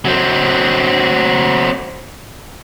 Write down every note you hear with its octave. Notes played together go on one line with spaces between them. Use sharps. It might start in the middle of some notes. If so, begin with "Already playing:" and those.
F#3 C4